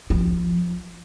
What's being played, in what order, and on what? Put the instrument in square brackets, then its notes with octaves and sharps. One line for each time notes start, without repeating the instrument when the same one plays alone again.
[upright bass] F3